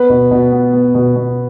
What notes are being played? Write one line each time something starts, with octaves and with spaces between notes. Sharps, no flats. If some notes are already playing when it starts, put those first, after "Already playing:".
Already playing: B3 B4
B2
B2
B3
B3
B2
B2